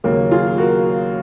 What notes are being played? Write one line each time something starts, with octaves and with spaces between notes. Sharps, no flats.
D#2 C#3 F#3 A#3
F4 G#4
F#4 A#4